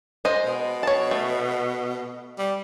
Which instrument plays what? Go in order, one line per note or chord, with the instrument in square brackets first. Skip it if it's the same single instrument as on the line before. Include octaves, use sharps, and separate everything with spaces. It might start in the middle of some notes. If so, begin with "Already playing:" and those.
[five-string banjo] G#3 C5 D#5
[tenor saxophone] B2
[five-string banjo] C#5 A5
A3
[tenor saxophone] G3